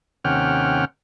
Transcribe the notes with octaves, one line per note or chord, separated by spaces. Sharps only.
D#2 C3 C#4 F#5 G5 F6